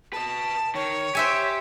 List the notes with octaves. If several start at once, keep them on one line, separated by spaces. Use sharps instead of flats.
B4 D#5 A5
D#3 C#5
G4 C5 E5 G#5